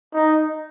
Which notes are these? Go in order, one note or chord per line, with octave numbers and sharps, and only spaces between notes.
D#4